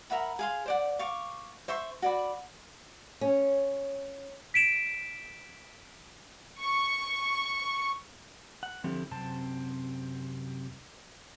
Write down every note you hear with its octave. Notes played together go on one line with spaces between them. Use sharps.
A#4 E5 F#5 B5
G#4 F5 C6
C5 D5 F#5
F5 C#6 D6
C5 E5 C6 C#6
F#4 D5 B5
C#4
B6 D7 E7
C#6
F#5
D3 F3 C4 E4 G4 A4
F#2 C3 C4 A5